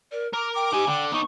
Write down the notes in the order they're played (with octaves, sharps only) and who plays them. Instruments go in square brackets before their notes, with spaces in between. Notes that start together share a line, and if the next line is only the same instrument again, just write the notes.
[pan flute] A#4 [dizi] D5
[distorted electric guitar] A#4 [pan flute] A#5 [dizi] D6
[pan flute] G5 [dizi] D6
[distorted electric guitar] D#4 G#5 [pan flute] G4
[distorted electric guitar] D3 [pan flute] G5
[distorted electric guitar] B3 D#4 [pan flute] C#6